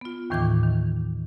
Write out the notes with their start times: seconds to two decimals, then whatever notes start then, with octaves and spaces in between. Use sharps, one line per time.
0.01 B3 F4
0.30 D#2 A2 D#3 E3 G5 D6
0.63 D#3